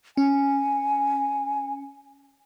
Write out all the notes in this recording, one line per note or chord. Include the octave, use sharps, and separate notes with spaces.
C#4 G#5